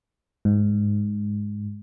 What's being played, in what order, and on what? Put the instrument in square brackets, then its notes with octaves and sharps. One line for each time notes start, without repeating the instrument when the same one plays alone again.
[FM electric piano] G#2